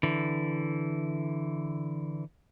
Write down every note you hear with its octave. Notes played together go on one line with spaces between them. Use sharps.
D3 E3